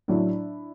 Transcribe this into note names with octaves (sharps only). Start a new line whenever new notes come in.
A2 F#3 D4 E4